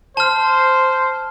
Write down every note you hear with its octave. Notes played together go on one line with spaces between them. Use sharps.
C5 A5 F6